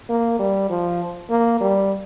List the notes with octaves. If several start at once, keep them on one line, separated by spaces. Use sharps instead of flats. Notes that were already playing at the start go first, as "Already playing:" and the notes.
A#3
G3
F3
A#3
G3